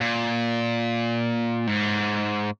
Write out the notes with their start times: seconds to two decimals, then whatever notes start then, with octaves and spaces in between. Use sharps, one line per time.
0.01 A#2
1.67 G#2